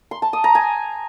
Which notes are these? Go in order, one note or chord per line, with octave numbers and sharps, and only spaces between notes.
C6
A5
D#6
A#5
G#5